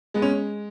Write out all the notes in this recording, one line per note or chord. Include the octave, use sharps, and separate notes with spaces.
G#3 B3
C#4